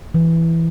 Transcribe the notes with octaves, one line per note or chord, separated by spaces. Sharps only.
E3